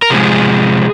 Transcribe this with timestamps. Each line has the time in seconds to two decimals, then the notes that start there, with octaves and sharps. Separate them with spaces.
0.02 A#4
0.10 C3 F3 G#3 G#4